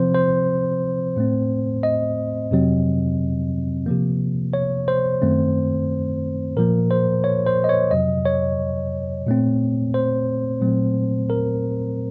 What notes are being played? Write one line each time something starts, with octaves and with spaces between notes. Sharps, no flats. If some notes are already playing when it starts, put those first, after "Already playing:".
Already playing: C3 F3 C4 C5
C5
A2 A3 C4
D#5
F2 C3 F#3 C4
C3 F3 A#3
C#5
C5
F#2 D#3 A3 C4
A#2 F3 A#3 A#4
C5
C#5
C5
D#5
C#5
F2 C3 F#3 D#5
C#5
A#2 A3 C4
C5
A#2 F#3 A3 C4
A#4